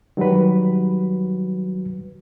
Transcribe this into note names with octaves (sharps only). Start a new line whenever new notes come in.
D#3 F#3 G3 F#4 B4